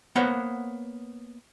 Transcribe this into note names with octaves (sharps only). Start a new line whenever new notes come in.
A#3 B3 C5 C#5 F#5